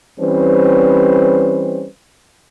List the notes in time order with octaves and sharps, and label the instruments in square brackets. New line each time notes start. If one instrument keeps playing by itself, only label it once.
[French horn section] E3 G3 C4 C#4 B4 C5